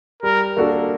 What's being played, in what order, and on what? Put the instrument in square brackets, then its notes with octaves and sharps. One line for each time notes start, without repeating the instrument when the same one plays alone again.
[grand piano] G3 [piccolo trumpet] A#4
[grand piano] A#3 D4 F#4 A4